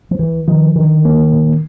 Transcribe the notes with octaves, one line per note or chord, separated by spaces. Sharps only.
F3
D2 E3
D#3 F3
D3 D#3
A#3
A#2